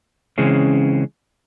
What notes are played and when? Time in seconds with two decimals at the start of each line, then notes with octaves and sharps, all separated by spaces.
0.38 C#3 E3 G#3 C4 C#4